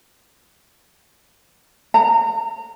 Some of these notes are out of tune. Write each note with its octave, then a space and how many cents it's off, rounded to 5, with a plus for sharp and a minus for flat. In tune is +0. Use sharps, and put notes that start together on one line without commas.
A#5 -25